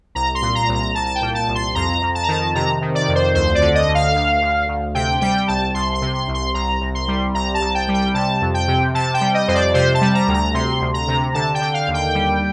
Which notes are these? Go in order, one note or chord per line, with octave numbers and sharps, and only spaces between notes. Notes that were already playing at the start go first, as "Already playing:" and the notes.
C2 A#5
C6
A#2
A#5
C2
A#5
C2 A5
A5
G5
A#2
A5
C2
C6
F2 A#5
F2
A5
A#5
D#3 A5
C3 A#5
D#3
D5
F2
C5
D2 C5
D5
D3
D#5
D2
F5
D2
D2
D2
C3 G5
G3 G5
C2 A5
C2 C6
C6
C3
C6
C2
C6
C2 A#5
C2
C6
G3
C2 A#5
A5
C2
G5
G3
G5
C3 A5
F2
G5
C3
C3 A5
G5
G3
D#5
F2 C5
D5
C3 C5
A5
G3
A#5
D2
A#5
C3 C6
D2
A#5
C3
D3 A5
G5
D3
F5
D#2
G5
G3